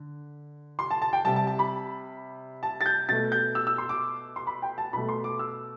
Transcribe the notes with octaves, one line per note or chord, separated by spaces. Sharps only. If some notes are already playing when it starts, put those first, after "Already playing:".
Already playing: D3
C6
A5
A5
G5
C3 G3 A5
A5
A5
B5
A5
A6
G6
B2 A3 A6
G6
E6
E6
C6
D6
C6
B5
G5
A5
B2 A3 B5
C6
D6
E6